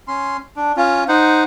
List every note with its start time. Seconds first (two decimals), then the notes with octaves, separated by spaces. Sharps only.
0.08 C#4 C6
0.56 D4
0.77 C#4 F4
1.08 D#4 C5 F#5